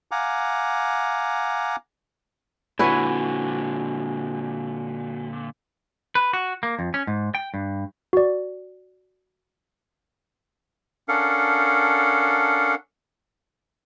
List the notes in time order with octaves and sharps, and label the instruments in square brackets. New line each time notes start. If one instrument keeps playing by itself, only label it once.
[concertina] F5 F#5 G#5 A#5 D6
[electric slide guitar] A#2 D3 [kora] E4 B4 C#5 [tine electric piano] F#4 G#5
[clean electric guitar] B4
F#4
A#3
F2
C#4
G#2
G5
G2
[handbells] F#4 D5
[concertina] C#4 D4 A4 A#4 F5 F#5